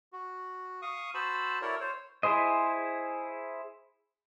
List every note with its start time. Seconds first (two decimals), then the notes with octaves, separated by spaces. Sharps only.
0.13 F#4
0.82 F5 C#6 D#6
1.14 F#4 C5 A5 B5 E6
1.62 E4 F#4 A4 A#4 C#5 D5
1.80 C5 C#5
2.23 E4 G#4 C5 D#5